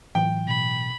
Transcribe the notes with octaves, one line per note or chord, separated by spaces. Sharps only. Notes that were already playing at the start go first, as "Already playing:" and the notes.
A2 E3 F#3 G5
B2 B5